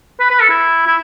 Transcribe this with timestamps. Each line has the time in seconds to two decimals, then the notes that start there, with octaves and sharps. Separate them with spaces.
0.20 B4
0.30 B4
0.40 A4
0.50 E4
0.87 E4